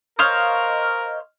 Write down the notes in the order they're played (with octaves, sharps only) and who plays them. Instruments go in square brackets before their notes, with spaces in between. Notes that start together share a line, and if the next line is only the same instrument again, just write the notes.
[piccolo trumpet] A#4 [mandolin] C5 C#5 F5 [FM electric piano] D#5 F6